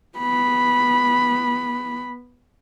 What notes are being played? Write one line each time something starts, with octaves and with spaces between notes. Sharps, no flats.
B3 B5